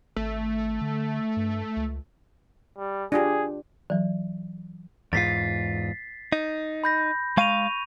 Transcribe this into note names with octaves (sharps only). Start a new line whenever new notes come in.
G#1 A3
D3
G2
C#2
G3
D4 F4 G4 G#4
E3 F#3
E2 G#2 F4 A6 B6 C7
D#4
B5 G6 A#6
G#3 F5 C#6 D#7 F7